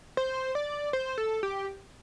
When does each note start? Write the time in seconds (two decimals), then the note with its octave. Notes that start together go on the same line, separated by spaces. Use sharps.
0.17 C5
0.55 D5
0.93 C5
1.18 A4
1.43 G4